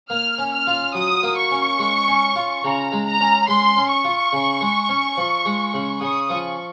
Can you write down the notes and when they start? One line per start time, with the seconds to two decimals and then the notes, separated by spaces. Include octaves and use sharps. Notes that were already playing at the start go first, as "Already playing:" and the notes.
0.10 A#3 F6
0.38 C#4
0.53 F6
0.67 F4
0.94 F#3 D#6
1.23 A#3
1.37 C#6
1.51 C#4
1.79 G#3
2.08 C#4
2.36 F4
2.64 C#3 A#5
2.92 G#3
3.06 A#5
3.21 C#4
3.48 G#3 C6
3.76 C#4
3.90 C#6
4.05 F4
4.33 C#3
4.61 G#3
4.89 C#4
5.17 F3
5.45 G#3
5.74 C#3
6.01 C#3 D#6
6.30 F3 C#6